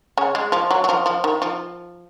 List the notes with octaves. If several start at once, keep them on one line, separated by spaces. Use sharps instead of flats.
C#3 C#4
G#3
F3
F#3
F#3
F3
F3
D#3
F3